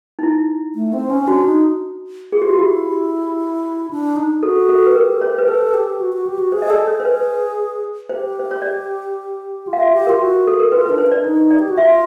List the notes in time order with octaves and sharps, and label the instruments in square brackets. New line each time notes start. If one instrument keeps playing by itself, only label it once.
[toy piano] D#4
E4
[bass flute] A3
C4
C#4
[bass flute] D4 [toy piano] F#4
[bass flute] D#4
[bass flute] F4 [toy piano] G#4
[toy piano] G4
F#4
[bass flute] E4 [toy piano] G4
[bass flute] D4
D#4
[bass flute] F#4 [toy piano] A4
[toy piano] A4
B4
[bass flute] G4 [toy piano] A#4
[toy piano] C#5
C5
B4
[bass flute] A4 [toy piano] C5
[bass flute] G4
F#4
F#4
G4
F#4
[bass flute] G#4 [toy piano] C5
[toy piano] D#5
[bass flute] A4 [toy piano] D5
[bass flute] G#4 [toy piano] C#5
[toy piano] C5
B4
[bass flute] G4 [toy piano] C5
[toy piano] C5
C#5
D5
[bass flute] F4
[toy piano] F5
E5
[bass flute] G4
[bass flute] F4 [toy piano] A#4
[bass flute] F#4
[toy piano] A4
A#4
[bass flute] F4 [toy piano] B4
[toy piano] B4
[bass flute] D4
[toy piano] C5
[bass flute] D4 [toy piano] D5
[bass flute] D#4
[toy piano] D5
[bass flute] G4
F#4
[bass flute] F4 [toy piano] E5